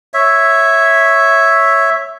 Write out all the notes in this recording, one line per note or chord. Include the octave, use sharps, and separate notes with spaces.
C#5 E5